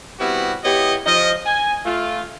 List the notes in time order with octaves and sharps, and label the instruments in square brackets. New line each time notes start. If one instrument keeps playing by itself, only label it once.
[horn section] G3 B3 C4 E4 F#4
B3 E4 G4 C#5 D#5
F3 D#5
G#5
A3 F4